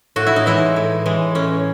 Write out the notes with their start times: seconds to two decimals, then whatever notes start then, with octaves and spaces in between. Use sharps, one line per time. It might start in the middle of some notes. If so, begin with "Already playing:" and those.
0.16 A2 F#4
0.26 E4
0.36 D#4
0.46 E3 G#3 E4
0.76 A2
1.06 E3 G#3
1.35 A2 C#4